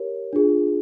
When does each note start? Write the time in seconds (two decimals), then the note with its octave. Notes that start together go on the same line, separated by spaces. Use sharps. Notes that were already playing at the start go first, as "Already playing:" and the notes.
Already playing: G4 A#4 C#5
0.33 D4 F4 G#4